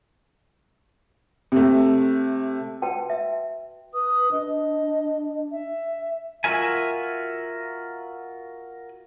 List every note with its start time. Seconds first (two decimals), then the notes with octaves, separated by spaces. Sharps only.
1.52 C3 A3
2.82 F#4 B4 G5 A5
3.10 E5
3.94 B4 D#6
4.32 D4 D#5
5.51 E5
6.44 F4 F#4 A#4 E5 G#5